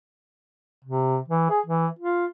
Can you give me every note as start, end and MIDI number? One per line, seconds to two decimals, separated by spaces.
0.84 1.18 48
1.28 1.46 52
1.50 1.60 68
1.66 1.87 52
1.99 2.26 65